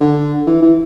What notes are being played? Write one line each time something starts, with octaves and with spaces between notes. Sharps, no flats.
D3
E3
E3